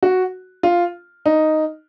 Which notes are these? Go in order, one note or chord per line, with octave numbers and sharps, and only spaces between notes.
F#4
F4
D#4